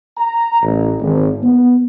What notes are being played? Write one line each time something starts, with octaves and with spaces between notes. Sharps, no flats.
A#5
A1
G#1
B3